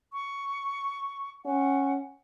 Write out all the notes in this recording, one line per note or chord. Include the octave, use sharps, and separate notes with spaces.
C#6
C#4 F#5